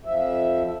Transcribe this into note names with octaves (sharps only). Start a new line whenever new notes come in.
F2 F3 E5